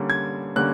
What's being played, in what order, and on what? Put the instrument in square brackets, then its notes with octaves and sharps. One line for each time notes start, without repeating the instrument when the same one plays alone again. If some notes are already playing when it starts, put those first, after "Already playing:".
Already playing: [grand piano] D3 G3 A#3 C#4
G#6
D3 G3 A#3 C#4 F#6